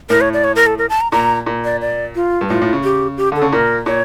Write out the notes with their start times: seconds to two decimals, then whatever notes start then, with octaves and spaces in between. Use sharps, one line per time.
0.10 A2 A#4
0.21 C#5
0.33 D5
0.44 C#5
0.56 A#4
0.67 A4
0.78 A#4
0.90 A5
1.01 A#5
1.12 A#2 A#5
1.46 A#2
1.65 D5
1.81 D5
2.15 F4
2.41 G2
2.49 A2 F4
2.62 A2
2.73 C#3
2.84 G4
3.17 G4
3.32 D3 A4
3.42 C#3
3.52 A#2 A#4
3.86 A#2 C#5